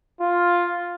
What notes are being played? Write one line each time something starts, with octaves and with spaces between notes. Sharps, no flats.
F4